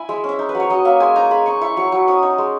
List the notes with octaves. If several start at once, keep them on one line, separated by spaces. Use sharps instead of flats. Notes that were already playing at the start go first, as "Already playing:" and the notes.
Already playing: E4 G#5 B5
G#3 E5
C#4
E5
D#4
B4
F#3
C#5
F#3 D#5
A#3 E5
G#3 G#5
D#4 A#5
G#3 B5
D#4 C#6
E4 C#6
F#3 C#6
F#3
C#4 D#6
D#4
G#3